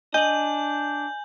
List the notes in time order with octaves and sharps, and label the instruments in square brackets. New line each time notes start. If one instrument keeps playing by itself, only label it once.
[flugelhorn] D4 [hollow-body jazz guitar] D#5 [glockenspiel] G#5 F#7 [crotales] G6